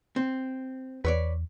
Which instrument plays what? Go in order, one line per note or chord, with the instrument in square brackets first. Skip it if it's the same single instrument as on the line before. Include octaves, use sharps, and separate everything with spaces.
[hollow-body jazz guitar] C4
[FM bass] E2 [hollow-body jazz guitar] B4 C#5 D5